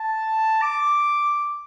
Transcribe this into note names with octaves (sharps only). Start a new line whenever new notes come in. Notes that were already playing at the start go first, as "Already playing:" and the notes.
Already playing: A5
D6